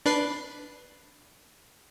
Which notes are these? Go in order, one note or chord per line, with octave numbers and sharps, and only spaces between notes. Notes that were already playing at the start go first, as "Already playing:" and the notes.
D4 B4 C7